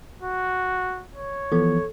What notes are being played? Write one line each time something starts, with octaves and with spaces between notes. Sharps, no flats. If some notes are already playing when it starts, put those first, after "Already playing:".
F#4
C#5
E3 F3 B3 A4